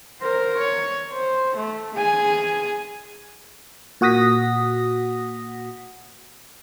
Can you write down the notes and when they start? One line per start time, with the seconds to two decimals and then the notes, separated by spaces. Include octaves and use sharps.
0.21 A#4 C5
0.57 C#5
1.12 C5
1.56 A3
1.95 G#4 G#5
4.01 A#2 F#4 F#5 D#6 A#6 B6